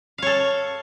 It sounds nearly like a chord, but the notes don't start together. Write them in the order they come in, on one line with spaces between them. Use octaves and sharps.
F5 C#5 A4